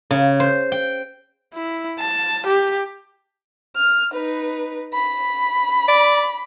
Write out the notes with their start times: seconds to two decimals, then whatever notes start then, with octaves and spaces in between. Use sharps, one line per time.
0.11 C#3
0.40 C5
0.72 G5
1.54 E4
2.00 A5
2.47 G4
3.77 F6
4.14 D#4 B4
4.93 B5
5.88 D5